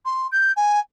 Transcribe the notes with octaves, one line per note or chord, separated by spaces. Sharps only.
C6
G6
G#5